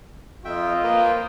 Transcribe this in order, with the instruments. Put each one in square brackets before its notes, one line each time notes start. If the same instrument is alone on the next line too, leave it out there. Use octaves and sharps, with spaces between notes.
[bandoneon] F2 E5 G5 [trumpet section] F4 D#5
[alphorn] A#3 [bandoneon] B4 C5 G5